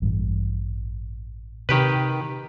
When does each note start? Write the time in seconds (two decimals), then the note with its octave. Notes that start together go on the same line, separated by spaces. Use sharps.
0.02 A1 G2
1.69 C3 D#3 G4 B4